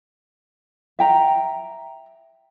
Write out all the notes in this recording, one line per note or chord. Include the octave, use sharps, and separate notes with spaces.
E5 G5 A#5